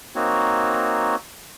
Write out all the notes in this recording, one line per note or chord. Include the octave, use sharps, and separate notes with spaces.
A#3 C4 D#4 F#4 C#5